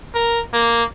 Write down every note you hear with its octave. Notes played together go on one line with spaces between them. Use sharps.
A#4
A#3